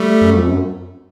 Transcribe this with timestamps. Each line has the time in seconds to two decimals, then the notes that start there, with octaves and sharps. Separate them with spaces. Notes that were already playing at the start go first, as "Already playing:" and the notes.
Already playing: G3 A3
0.21 F#2
0.35 F2
0.49 F#2